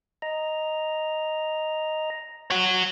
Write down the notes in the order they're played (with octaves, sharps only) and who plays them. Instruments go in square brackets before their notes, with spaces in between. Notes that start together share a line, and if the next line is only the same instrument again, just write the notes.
[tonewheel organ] D#5 A#5
[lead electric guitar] C#5 F#5